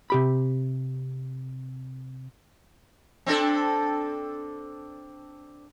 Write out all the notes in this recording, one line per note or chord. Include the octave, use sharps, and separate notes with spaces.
C3 G4 B5
C4 D4 A4